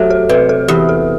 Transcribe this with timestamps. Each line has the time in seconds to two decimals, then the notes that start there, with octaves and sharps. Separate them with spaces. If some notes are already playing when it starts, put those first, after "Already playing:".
Already playing: F#3 A3 F#4 G4 A4
0.10 A4
0.29 C3 B4
0.49 A4
0.68 E2 G4
0.89 A4